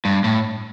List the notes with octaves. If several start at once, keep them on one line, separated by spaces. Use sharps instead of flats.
G2
A2